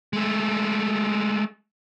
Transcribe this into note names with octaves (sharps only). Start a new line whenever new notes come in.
G#3 A3